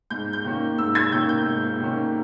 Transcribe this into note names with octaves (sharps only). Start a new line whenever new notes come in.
G#2 G6
G6
D#3 A#3 C#4
G#2 E6
G#6
D#3 A#3 C#4 G6
G6
G#2
D#3 A#3 C#4